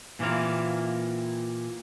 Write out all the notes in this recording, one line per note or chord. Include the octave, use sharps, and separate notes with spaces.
A#2 E3 A#3 C4 F5